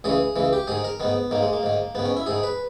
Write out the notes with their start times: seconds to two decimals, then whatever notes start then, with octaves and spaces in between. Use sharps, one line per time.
0.04 C#2 C#3 E3 G#4
0.36 C#2 C#3 E3
0.53 G4
0.67 G#2 D#3 G#4
0.84 A#4
1.00 G#2 D#3 B3
1.31 G#2 D#3 A#3
1.42 G#3
1.53 A#3
1.63 G#2 D#3
1.95 G#2 D#3 B3
2.05 C#4
2.17 E4
2.26 G#2 D#3 G#4
2.43 B4